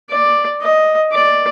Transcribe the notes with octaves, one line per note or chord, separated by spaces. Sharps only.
D5
D#5
D5